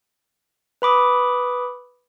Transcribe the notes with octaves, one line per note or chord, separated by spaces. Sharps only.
B4 B5 D6 D#6